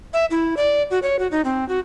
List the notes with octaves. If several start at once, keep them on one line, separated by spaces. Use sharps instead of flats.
E5
E4
D5
F#4
C#5
F#4
D#4
C4
F#4